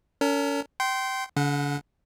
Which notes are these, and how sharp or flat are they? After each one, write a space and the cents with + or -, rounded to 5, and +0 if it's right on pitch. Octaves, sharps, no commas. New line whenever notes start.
C#4 +35 A#4 -35
G5 -25 C6 -5
D3 -45 F#5 -20